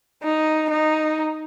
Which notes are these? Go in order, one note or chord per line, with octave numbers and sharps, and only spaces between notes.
D#4
D#4